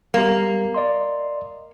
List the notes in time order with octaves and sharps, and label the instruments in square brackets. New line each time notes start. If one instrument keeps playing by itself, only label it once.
[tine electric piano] G3 B3 G4 [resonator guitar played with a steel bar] A#3
[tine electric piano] D5 D#5 C6